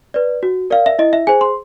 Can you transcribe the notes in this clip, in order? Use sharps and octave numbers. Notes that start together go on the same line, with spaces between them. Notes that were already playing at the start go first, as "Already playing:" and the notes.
B4 D5
F#4
A#4 D5 F5
E5
E4 D#5
E5
G#4 C5 G#5
C6